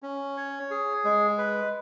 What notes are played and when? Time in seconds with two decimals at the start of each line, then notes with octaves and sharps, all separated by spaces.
0.03 C#4
0.37 C#5
0.71 G#4
1.05 G#3
1.38 B4